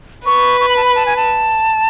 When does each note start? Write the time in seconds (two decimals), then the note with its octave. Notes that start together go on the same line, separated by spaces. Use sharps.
0.26 B4 C#6
0.61 C#6
0.69 B5
0.77 A5
0.84 B5
0.96 A5
1.06 G#5
1.16 A5